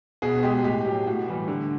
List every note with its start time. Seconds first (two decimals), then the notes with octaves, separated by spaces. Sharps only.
0.22 B2 F#4 G#4
0.43 G#3 G4
0.64 A2 G4
0.85 F#3 G4
1.06 A2 F#4
1.28 E3 G3
1.48 D3